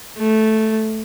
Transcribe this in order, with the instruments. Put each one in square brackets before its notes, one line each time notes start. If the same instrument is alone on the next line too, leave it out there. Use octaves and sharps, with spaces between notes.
[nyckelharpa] A3